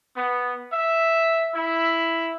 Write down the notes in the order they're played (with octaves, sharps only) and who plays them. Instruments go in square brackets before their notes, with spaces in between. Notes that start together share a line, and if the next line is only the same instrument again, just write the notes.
[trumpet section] B3
E5
E4